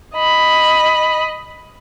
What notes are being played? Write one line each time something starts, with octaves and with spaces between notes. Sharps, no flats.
D#5 B5